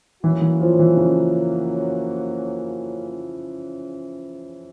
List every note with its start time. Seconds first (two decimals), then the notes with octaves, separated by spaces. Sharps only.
0.23 E3 F#3 A#3 C#4 F#4
0.41 E3
0.61 F3
0.74 F3
0.79 E3
0.97 C#3